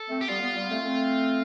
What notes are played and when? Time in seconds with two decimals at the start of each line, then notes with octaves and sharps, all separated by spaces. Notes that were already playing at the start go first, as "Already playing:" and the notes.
Already playing: A4
0.09 A3 C4
0.21 G4
0.28 G3 B3 F4
0.42 G3 B3
0.55 G3 B3
0.69 A3 C4
0.84 A3 C4